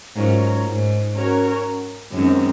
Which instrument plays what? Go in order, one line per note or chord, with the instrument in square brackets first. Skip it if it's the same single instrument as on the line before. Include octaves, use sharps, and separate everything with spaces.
[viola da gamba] G#2 [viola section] F#3 C#4 F4 A#4 C#5
[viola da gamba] G#2
[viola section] C#4 F#4 A#4 C#5
[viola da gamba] F#2 [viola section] D#3 G#3 C4